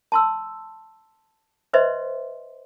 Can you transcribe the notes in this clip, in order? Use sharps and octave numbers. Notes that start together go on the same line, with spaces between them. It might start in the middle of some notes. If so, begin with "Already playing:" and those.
A5 C6 E6
B4 C5 D#5 E5 C6